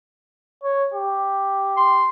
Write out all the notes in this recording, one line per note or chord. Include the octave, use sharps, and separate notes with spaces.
C#5
G4
C6